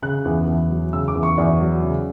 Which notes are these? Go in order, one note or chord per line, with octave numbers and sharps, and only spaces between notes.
C#3 F#6
E2
E2
F#3
C#3 E6
D6
E2
C#6
E2 D5
F#3
C#3